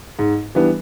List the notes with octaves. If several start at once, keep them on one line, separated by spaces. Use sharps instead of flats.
G#2
E3 G3 B3 D4